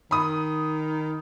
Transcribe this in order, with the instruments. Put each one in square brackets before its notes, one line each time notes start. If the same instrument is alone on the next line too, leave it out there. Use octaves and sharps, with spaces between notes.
[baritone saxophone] D#3 [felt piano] B5 D#6